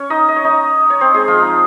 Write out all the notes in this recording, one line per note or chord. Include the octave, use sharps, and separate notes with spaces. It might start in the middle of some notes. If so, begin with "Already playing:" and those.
Already playing: C#4 C#5
D#4 D#5
D#5
C#5
D#4 D#5
C#5
C4 C5
G#3 G#4
F3 F4
D#4